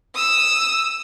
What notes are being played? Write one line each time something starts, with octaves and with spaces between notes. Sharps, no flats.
D#6 E6